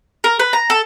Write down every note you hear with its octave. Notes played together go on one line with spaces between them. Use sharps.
A#4
B4
A#5
A4